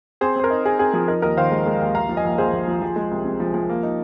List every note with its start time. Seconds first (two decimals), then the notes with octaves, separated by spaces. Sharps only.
0.21 C4 G#4 C5
0.36 C4 C5
0.44 A#4
0.50 D#4
0.65 D#4 G#4
0.79 C4 G#4
0.93 F3 G#4
1.08 D#4 A#4
1.22 D#2 A#4 D#5
1.37 D#3 C5 F5
1.51 G#3
1.66 G#3
1.80 D#2
1.95 A#1 F5 A#5
2.09 F3
2.17 D#5 G#5
2.24 A#1
2.38 A#1 G#4 C5
2.53 A#1
2.68 F3
2.82 F3
2.96 G#3
3.11 C2
3.25 C3
3.40 F3
3.54 F3
3.70 A#3
3.83 D#4